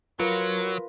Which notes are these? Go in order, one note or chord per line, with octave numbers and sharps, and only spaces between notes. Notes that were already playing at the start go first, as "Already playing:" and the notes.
F#3 F4 A#4 B4